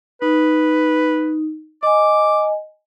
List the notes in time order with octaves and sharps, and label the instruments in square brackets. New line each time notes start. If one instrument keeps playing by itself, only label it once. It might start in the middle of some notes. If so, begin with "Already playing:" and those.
[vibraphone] D#4 [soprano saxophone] B4
[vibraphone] D#5 G#5 [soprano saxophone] D6